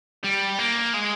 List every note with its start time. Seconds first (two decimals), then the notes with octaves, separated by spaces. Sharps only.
0.24 G3
0.59 A#3
0.94 G#3